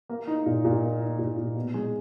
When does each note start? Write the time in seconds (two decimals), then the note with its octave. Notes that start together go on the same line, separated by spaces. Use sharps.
0.09 A#3
0.27 D#4
0.46 A#2
0.65 A#2
0.82 A#3
1.01 D#4
1.19 A#2
1.37 A#2
1.55 B2
1.74 G#3